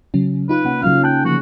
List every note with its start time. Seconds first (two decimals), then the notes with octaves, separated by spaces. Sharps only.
0.14 C#3 F#3 C#4
0.49 D#4 F4 B4
0.65 C3 A#3 C#4 F#5
0.82 C#3 F#3 A#3 C#4 F5
1.04 G5 A5 F#6
1.25 D3 F3 A#3 F#4